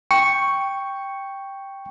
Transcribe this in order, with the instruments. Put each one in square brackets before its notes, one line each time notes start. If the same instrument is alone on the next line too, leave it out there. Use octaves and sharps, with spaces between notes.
[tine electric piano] G5 C#6 C#7